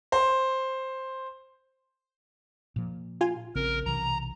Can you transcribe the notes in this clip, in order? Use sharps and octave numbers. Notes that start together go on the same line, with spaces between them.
C5
A#2 F3
F4 G#5
A#1 C#3 C4 A#4
B1 C3 E3 A#5